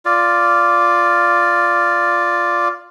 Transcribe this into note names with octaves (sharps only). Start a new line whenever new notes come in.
F4 D5